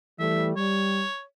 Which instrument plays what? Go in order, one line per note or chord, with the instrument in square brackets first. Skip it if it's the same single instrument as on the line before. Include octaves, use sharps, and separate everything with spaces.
[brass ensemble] E3 G3 A3 [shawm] E5
[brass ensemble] G3 [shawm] C#5